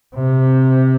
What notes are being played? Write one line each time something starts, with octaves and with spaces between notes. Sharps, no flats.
C3